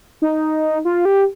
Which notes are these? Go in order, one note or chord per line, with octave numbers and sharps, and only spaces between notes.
D#4
F4
G4